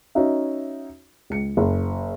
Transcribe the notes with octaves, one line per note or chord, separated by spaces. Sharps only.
C#4 D#4 F#4 E5
C#2 C#7
F#1